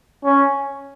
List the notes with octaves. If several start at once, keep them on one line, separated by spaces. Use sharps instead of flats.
C#4